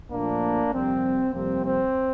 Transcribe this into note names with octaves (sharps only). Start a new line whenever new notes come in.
A#2 F3 A3 A#3 D4
F2 C3 G3 C4
F2 C3 G3 A#3 C4
C4